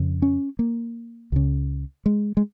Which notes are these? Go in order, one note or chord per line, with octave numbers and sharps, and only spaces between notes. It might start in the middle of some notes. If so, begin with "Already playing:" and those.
Already playing: F2 C#3
C#4
A#3
C#2 C#3
G#3
G#3